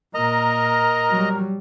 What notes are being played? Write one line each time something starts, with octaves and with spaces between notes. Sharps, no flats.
A#2 A#4 D#5 A#5
F#3 G3